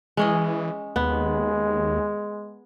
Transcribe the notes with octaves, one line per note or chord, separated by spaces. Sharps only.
E3 G#3 C#4 D#5
D#2 G#3 B3